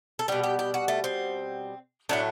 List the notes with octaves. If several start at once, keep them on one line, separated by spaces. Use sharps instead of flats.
A4
B2 G3 G4
G4
G4
F#4
A3
C4
A2 F#3 A3 D4